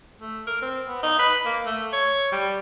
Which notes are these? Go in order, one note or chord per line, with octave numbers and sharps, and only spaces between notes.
A3
A#4
C4
B3
D#4
B4
A#3
A3
C#5
G3